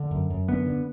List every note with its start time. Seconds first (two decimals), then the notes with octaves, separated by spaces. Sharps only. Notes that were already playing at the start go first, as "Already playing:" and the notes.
Already playing: D3
0.11 F#2
0.30 F#2
0.48 D3 B3
0.66 D3